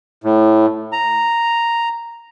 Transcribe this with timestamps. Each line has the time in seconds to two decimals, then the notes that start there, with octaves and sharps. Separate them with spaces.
0.24 A2
0.92 A#5